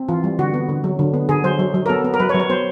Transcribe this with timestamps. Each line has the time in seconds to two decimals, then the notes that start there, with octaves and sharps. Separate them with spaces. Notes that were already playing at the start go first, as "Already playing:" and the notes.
Already playing: C4
0.09 E3 F4
0.24 G3
0.39 D3 F#4
0.54 B3
0.69 D3
0.84 F#3
0.99 D3
1.14 B3
1.29 D3 G#4
1.44 F#3 C5
1.59 F#3
1.74 F#3
1.86 A#4
1.89 B3 A4
2.05 B3
2.14 A#4
2.20 F#3 B4
2.29 C#5
2.34 F#3
2.40 C#5
2.50 B3 C5